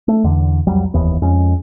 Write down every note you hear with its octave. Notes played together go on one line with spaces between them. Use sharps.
A3
E2 D3
C2 F2 F#3 G3
F1 D#2 E3 B3
F2 G#3 C#4